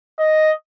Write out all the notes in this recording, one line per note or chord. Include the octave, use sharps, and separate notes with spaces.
D#5